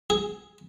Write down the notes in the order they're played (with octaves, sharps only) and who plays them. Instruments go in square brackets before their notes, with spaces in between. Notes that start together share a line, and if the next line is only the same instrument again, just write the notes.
[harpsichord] G#4